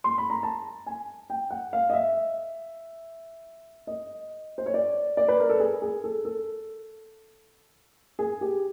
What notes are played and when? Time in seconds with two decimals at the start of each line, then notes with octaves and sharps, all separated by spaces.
0.04 C6
0.18 B5
0.30 A#5
0.43 A5
0.86 G#5
1.30 G5
1.50 F#5
1.73 F5
1.90 D#5
1.93 E5
3.87 D#5
4.58 C5
4.66 C#5
4.74 D5
5.17 D5
5.28 B4
5.40 A#4
5.49 A4
5.60 G#4
5.82 G#4
6.04 A4
6.25 A4
8.19 G#4
8.41 G4